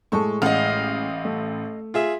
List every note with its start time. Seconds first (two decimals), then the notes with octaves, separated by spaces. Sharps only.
0.12 A2 G#3 A4 C#6
0.42 A1 D#5 F5 F#5
1.25 A3
1.94 F4 G#4 E5